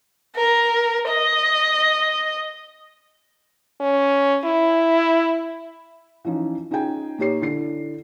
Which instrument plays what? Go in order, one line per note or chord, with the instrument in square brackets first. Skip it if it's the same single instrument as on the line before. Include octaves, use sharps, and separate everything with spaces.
[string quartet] A#4
D#5
[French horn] C#4
E4
[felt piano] E3 F3 C#4 D#4
C#4 D#4 F4 G#4 G5 G#5
A#2 D#4 G4 C#5 C7
D3 E4 C7